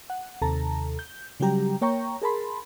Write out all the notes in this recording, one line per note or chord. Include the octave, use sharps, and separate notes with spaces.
F#5
D#2 C3 A4 A5 A#5
G6
C#3 F#3 G3 G4 A#5
A#3 C#5 G5 A#5 C#6
G#4 A#4 A5 B5 C6